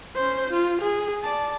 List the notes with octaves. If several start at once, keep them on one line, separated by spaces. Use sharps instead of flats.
C#4 C5
F4
G#4
D5 A5